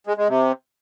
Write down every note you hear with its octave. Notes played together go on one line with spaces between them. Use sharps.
G#3
G#3
C3